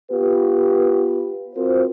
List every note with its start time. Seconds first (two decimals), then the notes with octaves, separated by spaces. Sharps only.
0.11 B3 F4 G4 B4
1.55 C4 F4 F#4 A#4 C5